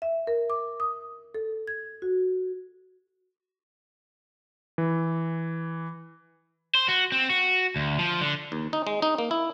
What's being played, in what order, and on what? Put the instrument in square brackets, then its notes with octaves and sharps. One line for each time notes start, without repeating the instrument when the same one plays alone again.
[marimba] E5
A#4
D6
D#6
A4
G#6
F#4
[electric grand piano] E3
[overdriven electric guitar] C5
F#4
C4
F#4
D2
F3
D3
[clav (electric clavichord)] D#2
D#4
G#3
D#4
A#3
E4